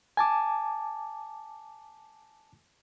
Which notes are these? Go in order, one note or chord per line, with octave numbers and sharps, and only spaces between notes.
G#5 A5 D6